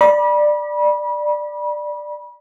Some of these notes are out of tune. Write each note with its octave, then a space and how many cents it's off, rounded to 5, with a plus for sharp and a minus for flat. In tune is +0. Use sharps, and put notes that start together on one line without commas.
D5 +15 B5 -35